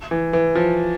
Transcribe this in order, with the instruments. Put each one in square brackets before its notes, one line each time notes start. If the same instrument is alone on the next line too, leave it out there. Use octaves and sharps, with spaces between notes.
[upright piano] E3
E3
F3